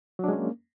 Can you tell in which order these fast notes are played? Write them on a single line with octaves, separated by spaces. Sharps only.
F#3 D4 G#3 C#4 A#3